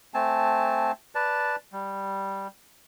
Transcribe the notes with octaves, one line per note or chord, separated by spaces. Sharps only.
A3 C4 G#5 A5
B4 D5 A5
G3